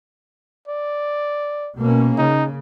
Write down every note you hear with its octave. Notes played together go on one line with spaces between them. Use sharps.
D5
B2 A#3 C#4
C#3 D#4